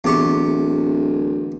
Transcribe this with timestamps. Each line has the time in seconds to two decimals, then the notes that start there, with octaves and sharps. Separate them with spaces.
0.04 D1 E2 G4 C#6